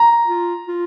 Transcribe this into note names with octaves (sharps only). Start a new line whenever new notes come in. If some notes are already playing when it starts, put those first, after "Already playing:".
Already playing: A#5
F4
F4